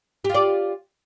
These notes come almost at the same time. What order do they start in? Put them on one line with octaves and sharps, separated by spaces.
G4 F4 D5